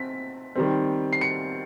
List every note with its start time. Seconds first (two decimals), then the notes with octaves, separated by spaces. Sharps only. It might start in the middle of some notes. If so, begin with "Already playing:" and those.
Already playing: C4 B6
0.55 D#3 G3 C4
1.13 C7
1.21 C#7